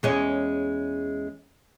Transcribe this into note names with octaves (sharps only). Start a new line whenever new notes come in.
E2 G#3 C#4